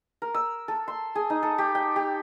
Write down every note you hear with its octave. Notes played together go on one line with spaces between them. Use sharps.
A#4
E6
A4
C6
G#4
D#4
A4
G4
G5
G4